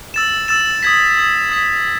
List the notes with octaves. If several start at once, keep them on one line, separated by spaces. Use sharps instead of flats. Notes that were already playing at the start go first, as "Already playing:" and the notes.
E6 A6 E7
E6 A6 E7
D#6 G#6 B6
D#6 G#6 B6
D#6 G#6 B6